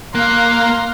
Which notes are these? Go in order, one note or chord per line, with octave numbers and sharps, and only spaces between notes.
A#3 F5 A#5 C6 F#6